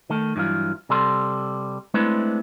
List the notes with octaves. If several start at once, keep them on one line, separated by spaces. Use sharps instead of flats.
D#3 A3
G2 E3 F#3 F4
C3 G3 A4 B5 C6
G#3 A3 C4 D4 E4 B4